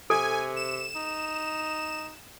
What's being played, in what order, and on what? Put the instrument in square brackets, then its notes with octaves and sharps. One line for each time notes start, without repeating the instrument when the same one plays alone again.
[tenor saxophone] C3 [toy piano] A4 [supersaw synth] G#5
[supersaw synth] E7
[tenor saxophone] D#4